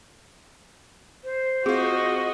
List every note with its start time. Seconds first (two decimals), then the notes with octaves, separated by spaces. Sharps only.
1.24 C5
1.66 C4 F4 F#4 G#4 D#5